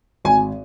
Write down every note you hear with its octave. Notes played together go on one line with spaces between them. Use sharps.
G#1 G#5